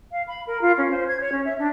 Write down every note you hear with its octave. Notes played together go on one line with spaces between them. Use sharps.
F5
B5
A#4
F4
C#4
C5
G#6
C#5
C#4
E5
D4